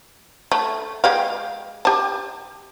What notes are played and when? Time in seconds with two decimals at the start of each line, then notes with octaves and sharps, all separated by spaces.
0.52 A3
1.04 G#3 G4 F5
1.85 G4 A5